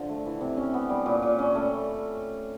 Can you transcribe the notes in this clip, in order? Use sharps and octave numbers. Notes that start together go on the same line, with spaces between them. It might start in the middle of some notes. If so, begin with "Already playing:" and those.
Already playing: D3 F3
A3
E3
C3
C#4
B3
G3
A#2
A#2
C#4
A3